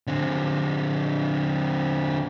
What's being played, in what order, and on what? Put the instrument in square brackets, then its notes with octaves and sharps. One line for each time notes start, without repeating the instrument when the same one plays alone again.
[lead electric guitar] D3 C4